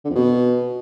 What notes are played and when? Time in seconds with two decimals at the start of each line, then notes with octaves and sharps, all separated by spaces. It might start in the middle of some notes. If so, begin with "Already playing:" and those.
0.05 D3
0.10 F2
0.16 B2